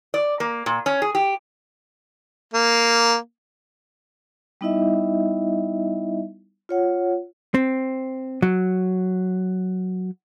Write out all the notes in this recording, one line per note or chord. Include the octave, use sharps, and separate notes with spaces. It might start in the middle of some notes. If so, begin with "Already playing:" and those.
D5
A#3
A#2
C#4
G#4
G4
A#3
G3 B3 D#4 E4 D#5 E5
F4 C#5 F#5
C4
F#3